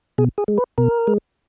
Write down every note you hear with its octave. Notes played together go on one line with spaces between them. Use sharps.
B2 G#4
G#4
G#3
B4
B2 A#4
G#3